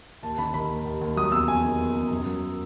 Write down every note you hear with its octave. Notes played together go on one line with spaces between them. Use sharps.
D#2 A5
D#3 B5
D#3 B5
D#2
D#2
D#2
F#3 D#6
E2 E6
E2 G#5
D#3
E2
E2
F#2
F#3